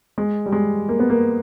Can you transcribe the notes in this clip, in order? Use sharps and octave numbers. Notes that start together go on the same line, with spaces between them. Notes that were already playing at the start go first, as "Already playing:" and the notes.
G#3
G3
G#3
A#3
B3
A#3